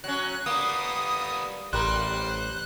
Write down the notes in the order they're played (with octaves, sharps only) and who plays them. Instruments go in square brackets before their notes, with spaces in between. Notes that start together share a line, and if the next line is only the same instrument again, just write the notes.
[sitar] F#3 C#4 [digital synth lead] F#6
[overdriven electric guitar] G3 B3 [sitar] A#3 [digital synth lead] D#6
[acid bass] A1 [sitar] G3 A#4 [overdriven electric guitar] C5 [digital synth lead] F#6